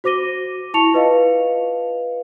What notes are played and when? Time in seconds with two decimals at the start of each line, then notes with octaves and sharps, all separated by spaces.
0.04 F#4 C5 D6 A#6 D#7 G7
0.74 E4 A5 C#6 C#7 F7
0.93 F4 B4 D#5 F5